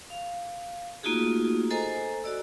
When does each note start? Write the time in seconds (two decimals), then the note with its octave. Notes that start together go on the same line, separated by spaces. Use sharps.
0.10 F5
1.03 A3 A#3 D#4 F4 F#4 G#4
1.70 A4 C5 D#5 G#5 A#5
2.24 F#4 D5 E6